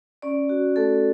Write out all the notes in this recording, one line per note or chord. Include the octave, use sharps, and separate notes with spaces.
C#4 D5
F#4
A3 A4